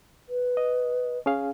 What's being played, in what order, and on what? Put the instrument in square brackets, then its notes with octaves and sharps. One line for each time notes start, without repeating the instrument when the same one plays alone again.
[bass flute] B4
[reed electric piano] D#5
C#4 G#4 F5